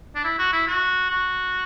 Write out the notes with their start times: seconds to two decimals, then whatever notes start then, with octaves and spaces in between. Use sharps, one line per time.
0.15 D4
0.24 E4
0.39 F#4
0.53 E4
0.67 F#4
1.10 F#4